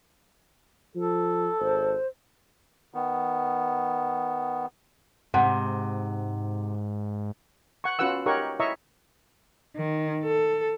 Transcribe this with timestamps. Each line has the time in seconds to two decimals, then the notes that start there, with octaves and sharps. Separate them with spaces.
0.95 F3 A4
1.60 G#1 C5
2.94 D#3 B3
5.34 G#2 C3 F#5
7.84 F#5 C#6
7.99 C#4 F4 F#4 B4 F#5 E6
8.26 D#4 G4 A#4 C#5 F#5 C#6
8.59 E4 C#5 D#5 E5 A#5 C#6
9.76 D#3
10.24 A4